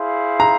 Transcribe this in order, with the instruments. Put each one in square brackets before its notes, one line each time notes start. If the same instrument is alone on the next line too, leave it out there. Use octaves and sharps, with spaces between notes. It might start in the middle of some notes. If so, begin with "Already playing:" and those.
Already playing: [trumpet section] E4 G#4 C5 F5
[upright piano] A#5